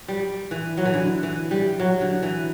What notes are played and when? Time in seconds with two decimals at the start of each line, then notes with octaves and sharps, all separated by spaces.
0.08 G3
0.51 E3
0.77 F#3
0.85 E3
0.94 D3
1.23 E3
1.51 G3
1.80 F#3
2.01 D3
2.22 E3